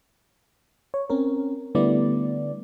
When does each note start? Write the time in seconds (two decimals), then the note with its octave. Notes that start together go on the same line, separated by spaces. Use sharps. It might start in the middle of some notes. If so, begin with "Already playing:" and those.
0.94 C#5
1.10 C4 C#4 A#4
1.75 D3 G3 A3 B3 E4 D5